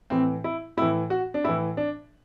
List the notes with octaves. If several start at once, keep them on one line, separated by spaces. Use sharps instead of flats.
A2 E3 C4
E4
A2 E3 E4
F#4
D4
A2 E3 E4
D4